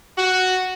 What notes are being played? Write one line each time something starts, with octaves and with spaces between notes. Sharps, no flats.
F#4